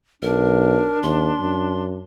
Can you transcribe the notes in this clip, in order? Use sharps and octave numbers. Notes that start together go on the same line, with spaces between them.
B1 D4 A#4
D#2 C6
F#2